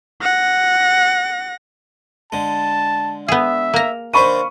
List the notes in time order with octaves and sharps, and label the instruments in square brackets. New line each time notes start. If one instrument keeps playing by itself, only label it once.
[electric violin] F#5 A#6
[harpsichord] D3 G#3 [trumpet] A5
[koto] B3 G#4 [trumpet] E5
[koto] A#3 A#5
[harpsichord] D#3 D4 C5 [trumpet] F5 [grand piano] B5 C#6 D#7